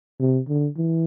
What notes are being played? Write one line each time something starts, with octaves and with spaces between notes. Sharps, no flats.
C3
D3
E3